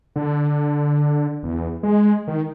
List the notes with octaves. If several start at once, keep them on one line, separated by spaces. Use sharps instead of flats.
D3
E2
G#3
D#3